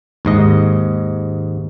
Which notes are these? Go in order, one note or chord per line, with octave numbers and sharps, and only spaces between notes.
D#2 G#2 D#5